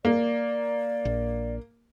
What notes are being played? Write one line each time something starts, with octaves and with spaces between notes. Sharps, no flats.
A#3 D5
A#1